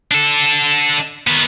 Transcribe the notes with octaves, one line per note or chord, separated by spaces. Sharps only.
D4 A4
D#3 B3